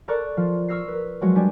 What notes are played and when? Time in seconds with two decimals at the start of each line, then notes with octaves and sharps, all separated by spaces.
0.08 A4 A#4 D5 A#5 C#6 F#6
0.37 F3 F4
0.68 C#6 E6 F6 A#6 C7
0.88 A#4 B4
1.21 F3 F#3 G#3 F#4
1.36 G3 D4 G#5